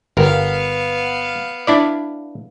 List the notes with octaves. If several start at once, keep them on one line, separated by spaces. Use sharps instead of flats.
G1 B3 A#4 F5
D4 E4 D5